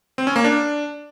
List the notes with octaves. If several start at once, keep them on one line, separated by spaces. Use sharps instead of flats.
C4
C#4
A#3
D4